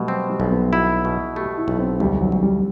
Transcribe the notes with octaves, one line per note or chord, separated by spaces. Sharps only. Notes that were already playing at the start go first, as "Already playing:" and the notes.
Already playing: B2 F#3 G3 A3
C4
G3
B1
B3
E4 F#4
B2 F#4
A3 G4
E4
B1
C4
D2 G3
F#3
D2
G3